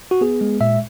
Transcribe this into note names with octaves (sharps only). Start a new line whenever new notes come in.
F#4
B3 G#4
G#3
A#2 E5